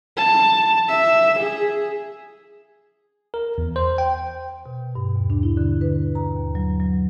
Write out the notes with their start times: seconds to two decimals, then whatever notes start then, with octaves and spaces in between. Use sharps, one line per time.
0.17 A5
0.89 E5
1.40 G#4
3.34 A#4
3.58 E2
3.76 C5
3.98 G5
4.66 B2
4.95 G2
5.16 D#2
5.30 D4
5.43 E4
5.57 D3
5.81 B4
6.15 A#5
6.36 D#2
6.55 F#3
6.80 F#3